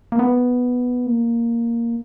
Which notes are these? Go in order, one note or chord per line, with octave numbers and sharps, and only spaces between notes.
A#3
B3
A#3